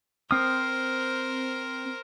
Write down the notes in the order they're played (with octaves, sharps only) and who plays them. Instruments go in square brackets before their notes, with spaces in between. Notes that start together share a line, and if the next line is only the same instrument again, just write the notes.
[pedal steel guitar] C4 D#6 [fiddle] A#4 C5 [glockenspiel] F6